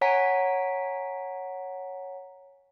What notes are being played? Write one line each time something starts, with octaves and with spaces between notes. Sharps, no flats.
C#5 F#5 G#5 A#5 B6 D7